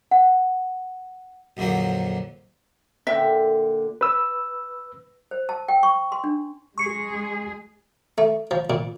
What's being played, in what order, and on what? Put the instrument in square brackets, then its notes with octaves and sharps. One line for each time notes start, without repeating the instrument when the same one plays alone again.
[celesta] F#5
[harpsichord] A#1 F2 D3 F#3 A#3
[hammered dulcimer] A#2 D3 [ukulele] E5 G5
[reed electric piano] B4 E6
[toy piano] C5
A5
G5
C#6
C6
D4
[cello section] G#3 G#4 [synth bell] C#6 C#7
[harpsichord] A3
F3
A#2